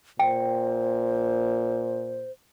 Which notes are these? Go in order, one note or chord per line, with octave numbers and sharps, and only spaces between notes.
A#2 C5 G5